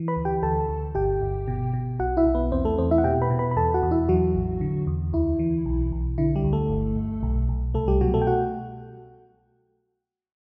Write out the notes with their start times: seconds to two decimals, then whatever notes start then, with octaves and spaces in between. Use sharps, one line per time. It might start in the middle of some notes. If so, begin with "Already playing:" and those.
Already playing: E3
0.08 B4 B5
0.17 D2
0.25 G4 G5
0.43 D2 A4 A5
0.69 D2
0.95 G1 G4 G5
1.21 G1
1.48 B2
1.74 B2
1.99 B1 F#4 F#5
2.17 E4 E5
2.25 B1
2.35 B3 B4
2.52 E2 C4 C5
2.65 A3 A4
2.78 E2 C4 C5
2.91 E4 E5
2.98 F#5
3.04 B2 G4 G5
3.21 B4 B5
3.30 B2
3.39 B4 B5
3.51 B5
3.56 E2 A4 A5
3.74 F#4 F#5
3.83 E2
3.91 E4 E5
4.09 E3 F#3 F#4
4.35 A1
4.61 D3
4.87 E2
5.13 D2 E4
5.39 E3
5.65 B1
5.92 B1
6.18 D3 E4
6.35 G3 G4
6.44 D2
6.53 A3 A4
6.70 G1
6.96 G1
7.23 B1
7.49 B1
7.74 C2 A3 A4
7.88 G3 G4
8.01 B2 F#3 F#4
8.14 A3 A4
8.22 G5
8.27 F#4 F#5